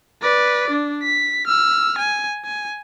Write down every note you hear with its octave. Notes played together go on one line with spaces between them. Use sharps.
B4 D5
D4
B6
E6 F6
G#5
G#5